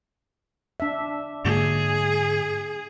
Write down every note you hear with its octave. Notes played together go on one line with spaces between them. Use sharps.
D4 E5
G#2 D3 A#3 G#4